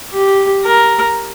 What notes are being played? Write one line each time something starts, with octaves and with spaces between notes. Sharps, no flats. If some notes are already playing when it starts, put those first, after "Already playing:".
G4
A#4